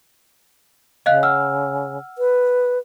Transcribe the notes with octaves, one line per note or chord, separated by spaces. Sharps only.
C#3 D#5 F5 F#6
F#5 E6 F6
B4